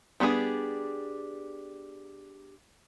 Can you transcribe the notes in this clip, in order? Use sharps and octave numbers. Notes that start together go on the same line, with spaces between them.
G3 B3 D4 G#4